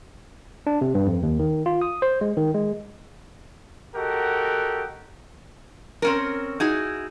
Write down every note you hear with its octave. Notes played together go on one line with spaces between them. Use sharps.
D4
C3
G2
F2
D#2
D#3
F4
D#6
C5
G#3
D#3
G#3
F#4 G4 A4 A#4 D#5 F#5
C4 C#4 A#4
D#4 E4 F#4 G#4